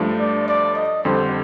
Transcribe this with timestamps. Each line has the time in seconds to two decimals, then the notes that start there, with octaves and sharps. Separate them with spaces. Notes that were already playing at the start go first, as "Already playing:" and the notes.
Already playing: G2 F3 A3 D4
0.19 D5
0.48 D5
0.75 D#5
1.04 F2 D3 G3 C5